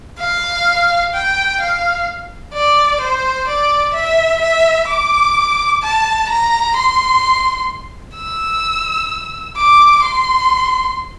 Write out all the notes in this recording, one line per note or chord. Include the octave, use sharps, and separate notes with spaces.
F5
G5
F5
D5
C5
D5
E5
E5
D6
A5
A#5
C6
E6
D6
C6